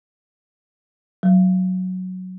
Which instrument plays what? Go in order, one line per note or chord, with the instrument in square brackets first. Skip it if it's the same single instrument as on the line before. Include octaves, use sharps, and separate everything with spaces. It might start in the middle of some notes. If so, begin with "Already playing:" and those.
[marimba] F#3